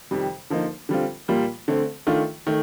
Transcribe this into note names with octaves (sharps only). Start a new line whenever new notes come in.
F2 C3 D#3 G3
D3 F3 A#3 D#4
D3 G3 C4 F4
A#2 G3 A#3 F4
D3 A3 C4
D#3 A3 D4 F4
D#3 A3